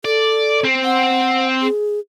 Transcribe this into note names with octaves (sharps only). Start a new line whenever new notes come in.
A4 D5
C4
F#5
G#4